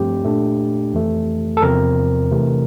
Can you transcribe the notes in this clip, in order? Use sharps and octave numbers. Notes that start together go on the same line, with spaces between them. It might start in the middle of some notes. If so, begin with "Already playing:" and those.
Already playing: G2 F3 A3 C4 G4
A#2 A3 D4
F2 E3 A3
A4
E2 C3 F3 C4 A#4
C3 E3 A3